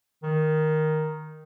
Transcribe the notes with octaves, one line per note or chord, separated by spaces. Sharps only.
D#3